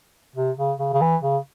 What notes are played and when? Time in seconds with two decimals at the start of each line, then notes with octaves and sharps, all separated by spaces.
0.36 C3
0.58 C#3
0.79 C#3
0.93 C#3
1.01 E3
1.22 C#3